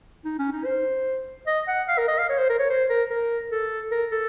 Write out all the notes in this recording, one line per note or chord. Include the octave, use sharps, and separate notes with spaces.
D#4
C#4
D#4
C5
D#5
F#5
F5
A#4
D#5
F5
C#5
C5
A#4
C#5
C5
A#4
A#4
A4
A#4
A4